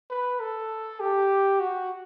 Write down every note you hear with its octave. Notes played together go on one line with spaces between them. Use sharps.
B4
A4
G4
F#4